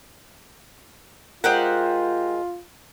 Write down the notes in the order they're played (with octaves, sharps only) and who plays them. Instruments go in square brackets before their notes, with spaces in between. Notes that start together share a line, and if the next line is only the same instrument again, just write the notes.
[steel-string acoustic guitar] G#3 A#4 [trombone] F4 [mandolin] G4 C5 F#5